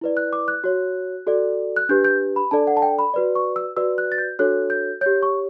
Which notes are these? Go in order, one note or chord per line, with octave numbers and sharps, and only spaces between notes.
E4 B4 D5
F#6
D6
F#6
F#4 C#5
F#4 A4 D5
F#6
D4 G4 B4 G6
G6
B5
D4 A4 D5 A5
F#5
A5
G5
B5
F#4 B4 D5
C#6
E6
F#4 B4 D5 E6
F#6
A6
G6
D4 F#4 A4 C#5 F#6
G6
G4 C#5 G6
C#6